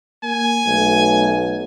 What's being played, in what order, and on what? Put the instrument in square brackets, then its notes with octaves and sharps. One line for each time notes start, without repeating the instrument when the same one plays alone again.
[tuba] A#3 [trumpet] G#5
[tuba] B1 [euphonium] A3